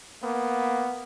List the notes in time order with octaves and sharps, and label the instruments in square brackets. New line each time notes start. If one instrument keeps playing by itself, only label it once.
[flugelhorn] A#3 [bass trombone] B3